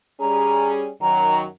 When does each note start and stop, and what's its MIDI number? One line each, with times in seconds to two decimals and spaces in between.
0.21 0.90 55
0.21 0.90 61
0.21 0.90 68
0.21 0.70 82
1.02 1.46 42
1.02 1.46 51
1.02 1.46 54
1.02 1.37 82